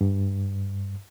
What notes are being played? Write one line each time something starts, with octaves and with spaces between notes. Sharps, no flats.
G2